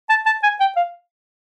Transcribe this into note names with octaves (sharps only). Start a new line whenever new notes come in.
A5
A5
G#5
G5
F5